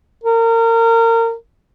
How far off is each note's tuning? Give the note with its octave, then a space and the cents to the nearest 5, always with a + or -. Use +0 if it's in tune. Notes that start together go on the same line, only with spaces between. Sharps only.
A#4 -30